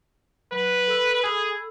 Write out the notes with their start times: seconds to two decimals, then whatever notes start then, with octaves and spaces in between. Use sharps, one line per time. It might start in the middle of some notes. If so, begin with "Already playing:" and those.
0.52 F#3 B4
0.88 A4 B5 E6
1.23 G#4